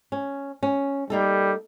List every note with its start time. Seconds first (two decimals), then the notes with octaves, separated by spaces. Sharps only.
0.12 C#4
0.63 C#4
1.10 G3 A#3 D#4 A4